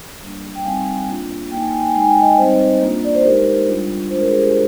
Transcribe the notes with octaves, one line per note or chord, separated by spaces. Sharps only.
G3 A#3 D4
G5
G3 C4 D#4 F5 G#5
A#3 D4 F4
A#3 D#4 G5 G#5
G5
G#5
G5
G#5
G#3 D#4 G5
G#5
G5
G#5
D#5 G5
G3 C4 D#4 C5 D#5
A#3 D4 F4
D5
C5
G#3 D#4 G4 A#4
G3 D4 F4
G#3 D4 F4 C5
A#4
G#4
G4 A#4